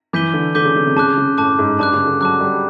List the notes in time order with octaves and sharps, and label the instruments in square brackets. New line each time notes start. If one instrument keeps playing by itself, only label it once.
[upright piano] E3 [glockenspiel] D6 G6 B6 D#7 G7
[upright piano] D3
[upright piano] D3 [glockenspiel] D6 G6 B6 D#7 G7
[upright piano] C#3
C#3
C3
[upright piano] C#3 [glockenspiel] A5 D6 F#6
[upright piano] C#3
[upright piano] A2 [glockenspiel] A5 D6 F#6
[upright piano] G#2
[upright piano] G2 [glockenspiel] A5 D6 F#6
[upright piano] C#3
D3
[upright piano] F#3 [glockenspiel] A5 D6 F#6
[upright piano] G3